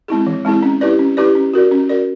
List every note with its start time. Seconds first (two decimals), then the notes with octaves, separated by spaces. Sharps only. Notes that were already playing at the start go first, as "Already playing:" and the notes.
0.08 G#3 C4 E4 G#4
0.26 E3
0.45 G#3 C4 E4 G#4
0.62 C#4
0.81 E4 G4 B4 D5
0.99 C#4
1.17 E4 G4 B4 D5
1.35 C#4
1.53 F#4 A#4 D5
1.71 C#4
1.89 F#4 A#4 D5